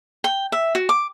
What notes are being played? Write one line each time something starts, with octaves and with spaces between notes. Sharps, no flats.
G5
E5
F#4
D6